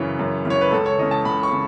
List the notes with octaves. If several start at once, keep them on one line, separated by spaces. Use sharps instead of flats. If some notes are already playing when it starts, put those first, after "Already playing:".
Already playing: F#2 C#3 E3 C#5
F#2
C#3 E3 C#5
B4
C#2 A4
C#5
C#3 E3 D#5
A5
C#2 B5
C#6
C#3